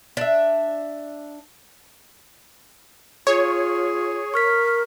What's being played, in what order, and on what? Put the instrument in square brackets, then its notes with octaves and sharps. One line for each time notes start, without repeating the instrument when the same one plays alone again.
[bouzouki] D4 E5
[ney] F4 [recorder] G#4 [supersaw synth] C#5
[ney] A#4 [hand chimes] C#6 F6 B6